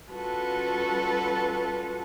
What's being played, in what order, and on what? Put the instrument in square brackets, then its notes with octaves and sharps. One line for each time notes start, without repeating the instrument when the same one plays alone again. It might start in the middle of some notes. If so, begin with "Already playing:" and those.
[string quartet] G3 C#4 F4 F#4 A4 B4